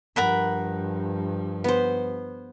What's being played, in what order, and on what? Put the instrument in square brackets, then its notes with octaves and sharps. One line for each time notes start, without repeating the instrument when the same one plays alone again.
[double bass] G2 F3 [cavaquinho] A#4 F#5 B5
[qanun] B3 C5